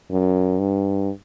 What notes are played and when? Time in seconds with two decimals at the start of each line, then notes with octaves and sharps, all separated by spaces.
0.11 F#2
0.59 G2